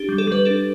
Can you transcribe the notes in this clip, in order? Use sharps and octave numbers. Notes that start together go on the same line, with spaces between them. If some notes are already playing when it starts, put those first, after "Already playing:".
Already playing: D4 G4
G3
A4
G3 B4
D4 A4